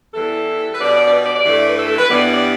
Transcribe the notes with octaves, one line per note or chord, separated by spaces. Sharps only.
E2 E3 G3 A4
B4
B2 G3 B3 D5
D5
D5
B4
D5
D5
G2 E3 A3
B4
A4
A4
B4
G2 E3 G3 B3 D5
D5